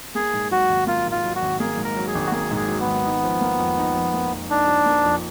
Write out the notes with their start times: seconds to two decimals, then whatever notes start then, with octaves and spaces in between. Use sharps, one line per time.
0.15 A#3 G#4
0.33 G#2
0.51 F#3 F#4
0.69 G#1
0.87 A#3 F4
1.06 G#2
1.11 F4
1.24 F#3
1.35 F#4
1.42 G#1
1.60 A#3 G#4
1.77 G#2
1.84 A#4
1.96 F#3
2.08 G#4
2.15 G#1
2.26 F#4
2.32 A#3 G#4
2.51 G#2
2.56 G#4
2.68 F#3
2.80 B3
2.86 G#1
3.05 D#4
3.24 F3
3.41 A#3
3.59 F2
3.78 D#4
3.96 F3
4.14 A#3
4.31 F2
4.50 D4 D#4
4.68 F3
4.86 A#3
5.04 F2